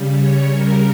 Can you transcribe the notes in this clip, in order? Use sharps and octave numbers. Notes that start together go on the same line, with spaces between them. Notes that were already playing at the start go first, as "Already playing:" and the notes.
Already playing: C#3 G3
C#5
C#3 G3 A#4